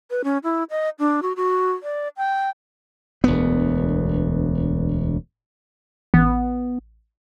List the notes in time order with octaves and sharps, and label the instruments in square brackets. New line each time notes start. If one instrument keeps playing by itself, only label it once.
[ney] B4
C#4
E4
D#5
D4
F#4
F#4
D5
G5
[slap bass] E1 D2 B3
[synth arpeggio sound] A1 [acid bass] B3